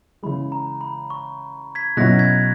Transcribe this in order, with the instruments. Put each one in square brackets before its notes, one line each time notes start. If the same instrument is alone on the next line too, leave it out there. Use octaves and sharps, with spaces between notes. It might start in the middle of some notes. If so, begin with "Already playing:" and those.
[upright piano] C#3 E3 G#3 [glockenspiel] B5
[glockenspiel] A#5
B5
C#6
G#6 B6
[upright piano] B2 F#3 C#4 E4 [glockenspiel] F#6 A#6
[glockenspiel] G#6 B6